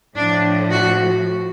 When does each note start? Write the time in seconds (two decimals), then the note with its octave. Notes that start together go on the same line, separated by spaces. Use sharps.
0.15 A2 F3 D4
0.71 F#4